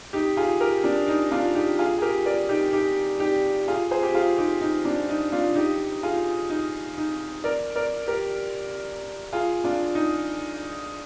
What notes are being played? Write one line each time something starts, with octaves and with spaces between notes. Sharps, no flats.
D#4 G4
F4 G#4
G4 A#4
D4
D#4
D4 F4
D#4 G4
F4 G#4
G#4
G4 A#4
A#4 D5
D#4 G4
D#4 G4
D#4 G4
F4 G#4
G#4 C5
G4
F4 G#4
D#4 G4
D#4
D4
D#4
D4 F4
D#4 G4
F4 G#4
D#4
D#4
A#4 D5
A#4 D5
G4 A#4
F4 G#4
D4 F4
D#4